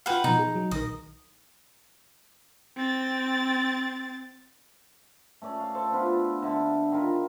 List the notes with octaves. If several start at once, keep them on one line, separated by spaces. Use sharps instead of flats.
F4 B4 F#5 G5 F6
B2 F3 D#4
G#4
F#3
A#1 D#3 A#4 D#5
C4 A6
A3 C#4 D5
F5
A4 C5 A5
B3 D4 F4 B5
D3 E5 G#5 B5
D#3 F4 A#4 B5